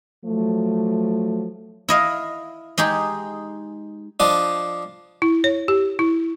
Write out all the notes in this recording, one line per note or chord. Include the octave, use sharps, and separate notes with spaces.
F3 F#3 A3
E4 D#5 F5
G#3 D#4 G4 G#4
F3 D4 D#5
E4
C#5
G4
E4